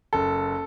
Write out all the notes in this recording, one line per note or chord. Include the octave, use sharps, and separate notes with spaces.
F#1 A4